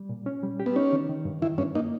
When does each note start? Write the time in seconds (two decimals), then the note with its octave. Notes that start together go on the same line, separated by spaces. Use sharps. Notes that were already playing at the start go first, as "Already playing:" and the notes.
Already playing: G3
0.09 A#2
0.26 C#4
0.43 G3
0.60 G4
0.66 B3
0.76 C#4 D#4
0.93 D#3
1.09 D#3
1.25 G2
1.42 D#3 E4
1.58 G2 C#4
1.75 A#3 D#4